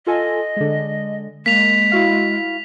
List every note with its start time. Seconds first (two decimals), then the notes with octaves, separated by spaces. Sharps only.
0.07 F4 A4 D#5 G#5
0.56 D3 G#3
1.46 G#3 A#3 B6 F7
1.92 E4 F#4 F5